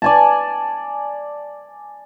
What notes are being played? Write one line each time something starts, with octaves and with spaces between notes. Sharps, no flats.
D5 G#5 A5